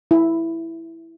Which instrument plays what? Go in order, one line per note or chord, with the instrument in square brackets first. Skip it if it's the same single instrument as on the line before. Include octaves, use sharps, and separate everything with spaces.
[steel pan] E4